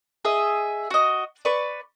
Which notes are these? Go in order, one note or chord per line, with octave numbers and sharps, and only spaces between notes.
G#4 D#5 E5
F#4 D#5
B4 D5 C#6